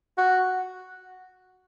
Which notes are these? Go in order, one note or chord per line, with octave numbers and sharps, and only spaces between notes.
F#4